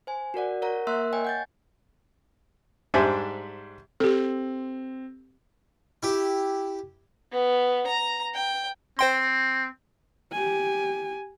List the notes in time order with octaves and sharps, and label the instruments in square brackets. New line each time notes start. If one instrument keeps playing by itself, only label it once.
[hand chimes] C5 G#5
F#4 A#4 D5 F#5
A#4 C#5 F#5 A#5
A#3 A#4 E5 C6 E6 F#6
C#5 D#5 G5 G#5
F#5 G6 A6
[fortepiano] G#2 G3 D4 C5 E5 G#5
[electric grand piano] C4 [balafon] G4 A4
[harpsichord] E4 G4
[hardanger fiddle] B3
A#5
G5
[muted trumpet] C4 [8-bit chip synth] C5 G5 C6
[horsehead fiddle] G4 G#5